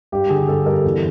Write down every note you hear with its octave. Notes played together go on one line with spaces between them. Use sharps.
G2 G4
D3 G#4
G2 A4
G2 A#4
E2 A4